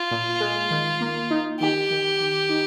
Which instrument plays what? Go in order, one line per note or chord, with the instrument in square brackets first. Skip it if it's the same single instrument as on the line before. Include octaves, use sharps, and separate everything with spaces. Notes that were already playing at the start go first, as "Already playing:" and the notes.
Already playing: [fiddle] F4
[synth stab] A#2
G#3
D#3
A#3
D#4
[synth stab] D#3 [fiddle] G4
[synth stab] D#3
D#3
D#4